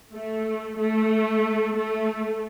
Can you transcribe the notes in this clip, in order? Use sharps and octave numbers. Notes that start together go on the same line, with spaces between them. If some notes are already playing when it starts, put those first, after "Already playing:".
A3
A3
A3